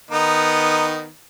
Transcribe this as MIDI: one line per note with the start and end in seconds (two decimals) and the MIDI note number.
0.11 1.07 51
0.11 1.07 59
0.11 1.07 63